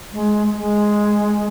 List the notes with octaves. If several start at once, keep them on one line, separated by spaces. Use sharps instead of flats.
G#3
G#3